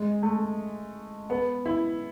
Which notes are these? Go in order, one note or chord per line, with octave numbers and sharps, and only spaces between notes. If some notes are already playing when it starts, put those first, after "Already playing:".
Already playing: G#3
A3
B3
E4